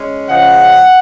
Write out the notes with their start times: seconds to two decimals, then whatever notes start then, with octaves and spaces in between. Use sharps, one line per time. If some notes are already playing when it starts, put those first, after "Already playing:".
Already playing: G#3 C#4
0.28 C#3 F3 G#3 C#4 F#5